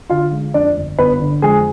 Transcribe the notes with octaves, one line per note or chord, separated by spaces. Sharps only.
D3 F4 F5
G#3
F2 D4 D5
G1
G1 B3 B4
D3
F2 G#3 G#4